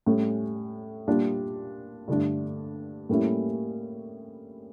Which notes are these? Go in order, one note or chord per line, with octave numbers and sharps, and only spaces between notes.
A2 G3 C#4
A#2 G3 D4 F4
G2 D3 A3 D4
A2 G3 A#3 C#4 E4